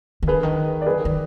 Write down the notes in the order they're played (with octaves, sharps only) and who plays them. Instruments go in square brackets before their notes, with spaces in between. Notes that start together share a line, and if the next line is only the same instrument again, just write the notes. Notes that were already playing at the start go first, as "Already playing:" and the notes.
[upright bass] D#3
[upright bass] D3 [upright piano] G#4 B4
[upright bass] D#3
[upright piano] D5
G#4 B4
[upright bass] D#3